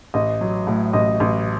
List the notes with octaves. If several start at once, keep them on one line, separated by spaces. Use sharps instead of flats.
A1 D#5
F#3
A2
A1 D#5
A1